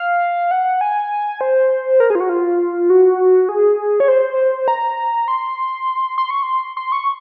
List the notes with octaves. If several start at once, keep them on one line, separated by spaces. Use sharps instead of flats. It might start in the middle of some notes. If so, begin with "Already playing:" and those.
Already playing: F5
F#5
G#5
C5
A#4
G#4
F4
F#4
F4
F#4
G#4
C#5
C5
A#5
C6
C6
C#6
C6
C6
C#6